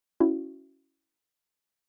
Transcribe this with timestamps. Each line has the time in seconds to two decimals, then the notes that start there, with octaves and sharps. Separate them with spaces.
0.20 C#4 E4 F#4